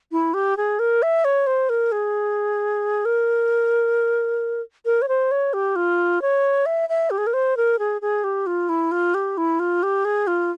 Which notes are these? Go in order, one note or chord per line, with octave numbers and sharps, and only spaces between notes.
E4
G4
G#4
A#4
E5
C#5
C5
A#4
G#4
A#4
A#4
C#5
C5
C#5
G4
F4
C#5
E5
E5
G4
G#4
A#4
C5
A#4
G#4
G#4
G4
F4
E4
F4
G4
E4
F4
G4
G#4
F4